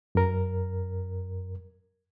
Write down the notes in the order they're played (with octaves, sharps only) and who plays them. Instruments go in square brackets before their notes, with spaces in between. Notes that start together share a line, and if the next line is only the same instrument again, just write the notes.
[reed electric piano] F#2 A#4